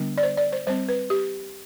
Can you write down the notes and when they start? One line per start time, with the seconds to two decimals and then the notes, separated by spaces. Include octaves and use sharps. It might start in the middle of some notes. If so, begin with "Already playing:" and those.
Already playing: D3 G3 B3 D4
0.18 D5
0.23 C5
0.37 D5
0.53 C5
0.67 G3 C4 C5
0.89 B4
1.10 G4